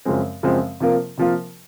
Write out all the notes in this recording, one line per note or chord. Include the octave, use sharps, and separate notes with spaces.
F#2 C#3 F3 G#3 C4
F#2 C#3 F3 G#3 C4
C3 F3 A#3 F4 A#4
C3 F3 A#3 F4 A#4